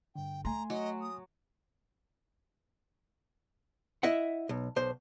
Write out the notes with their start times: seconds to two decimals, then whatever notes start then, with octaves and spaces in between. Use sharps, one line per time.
0.16 G2 D3 G5
0.45 A3 G#5 A#5 C6
0.70 F#3 D#5
1.01 D#6
4.03 E4 D#5 E5 F#5
4.49 B1
4.76 B1 C5